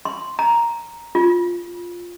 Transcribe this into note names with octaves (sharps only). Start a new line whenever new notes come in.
C6
A#5
F4